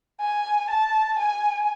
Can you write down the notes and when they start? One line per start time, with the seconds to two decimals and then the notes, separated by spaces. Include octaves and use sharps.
0.20 G#5
0.70 A5
1.19 G#5